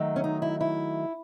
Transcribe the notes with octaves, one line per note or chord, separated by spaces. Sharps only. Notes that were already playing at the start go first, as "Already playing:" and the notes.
Already playing: D#3 F#3 A3
C#4
D#4
E4
E4